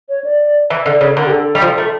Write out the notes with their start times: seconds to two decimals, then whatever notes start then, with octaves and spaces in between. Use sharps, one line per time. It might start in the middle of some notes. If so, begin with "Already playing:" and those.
0.09 C#5
0.24 D5
0.70 E3 E5
0.86 D3 D5
1.00 C#3 C#5
1.17 D3 A#4
1.26 G4
1.32 A4
1.55 G3
1.62 F3
1.78 A3